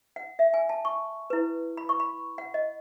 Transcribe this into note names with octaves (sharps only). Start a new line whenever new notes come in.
F#5
E5
G#5
A5
C#6
E4 B4
B5
C#6
B5
F#5
D#5